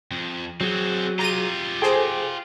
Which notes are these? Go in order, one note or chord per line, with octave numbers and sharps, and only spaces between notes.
F2
F#3 C4 F#4 G#4
F4 G4 A#5 D#7
G#4 A4 C5 G5